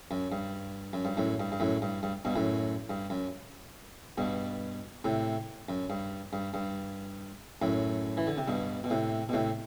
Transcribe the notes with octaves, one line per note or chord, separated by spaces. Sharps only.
F#2
G2
F#2
G2
F#2 A2
G2
G2
F#2 A2
G2
G2
G2 B2
F#2 A2
G2
F#2
G2 B2
A2 C3
F#2
G2
G2
G2
F#2 A2
E3
D3
C3
G2 B2
B2
A2 C3
B2
A2 C3